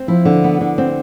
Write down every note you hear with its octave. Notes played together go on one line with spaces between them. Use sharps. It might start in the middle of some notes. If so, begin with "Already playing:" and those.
Already playing: C4
F3 E4
D3
B3
D3
C4